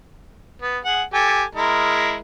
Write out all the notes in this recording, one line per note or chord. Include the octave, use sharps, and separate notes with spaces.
B3
G#4 F#5
G4 A4 G#5
G#3 E4 A#4